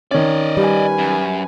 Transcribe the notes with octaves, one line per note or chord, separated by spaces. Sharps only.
D#3 C#4 D5 D#5
G3 B4 G#5
F#2